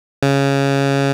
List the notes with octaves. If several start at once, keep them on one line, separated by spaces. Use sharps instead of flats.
C#3